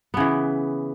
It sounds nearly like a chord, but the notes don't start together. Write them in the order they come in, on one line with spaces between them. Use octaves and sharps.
B3 C#3 E3